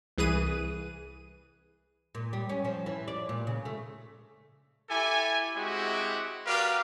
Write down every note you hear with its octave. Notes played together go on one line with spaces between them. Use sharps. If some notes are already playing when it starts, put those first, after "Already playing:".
C2 E3 G#4 B4 D#7
A#2
G3
C#4
F3
E3
D5
A#2
C#3
A3
E4 G4 A4 G#5
G#3 C4 E4 F#4 G4
F#4 G4 A#4 B4 D5 F5